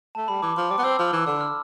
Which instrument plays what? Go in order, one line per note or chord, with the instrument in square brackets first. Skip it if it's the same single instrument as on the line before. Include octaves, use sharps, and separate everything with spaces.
[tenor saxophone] A3 [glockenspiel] A5
[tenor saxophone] G3 [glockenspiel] B5
[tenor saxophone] E3 [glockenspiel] D6
[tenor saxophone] F3 [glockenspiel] C6
[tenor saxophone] G3 [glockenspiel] D6
[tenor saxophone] B3
[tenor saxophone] C4 [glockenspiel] E6
[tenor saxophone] F3
E3
[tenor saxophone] D3 [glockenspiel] E6
[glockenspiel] F6